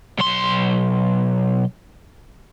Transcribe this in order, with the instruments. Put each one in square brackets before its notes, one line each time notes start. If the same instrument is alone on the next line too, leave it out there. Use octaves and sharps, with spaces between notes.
[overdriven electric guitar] B1 C6